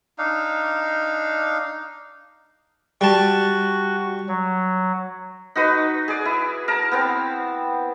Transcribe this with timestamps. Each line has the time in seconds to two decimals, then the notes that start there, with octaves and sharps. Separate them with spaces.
0.18 D4 D#4 F5
3.01 G3 F#4 A5
4.28 F#3
5.56 D#4 F#4 B4 D#5
6.08 G#4 D5
6.25 E4
6.68 A#4 A5
6.92 B3 C4